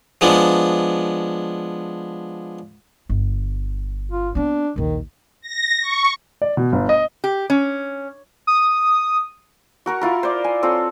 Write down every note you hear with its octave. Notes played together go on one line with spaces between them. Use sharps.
F3 G#3 B3 D4
G1
F4
B3 C4 D4
A#1 D#2 D#3
A#6
C#6
D5
B2
G1
D#5
G4
C#4
D#6
F#4 A#4 C#6
E4 F4 A#4
C5 D5
G#5
C4 F4 A4 C#5